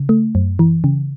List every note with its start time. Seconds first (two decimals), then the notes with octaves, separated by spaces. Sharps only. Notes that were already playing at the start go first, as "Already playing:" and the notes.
Already playing: C#3
0.09 A3
0.35 F#2
0.59 E3
0.84 C#3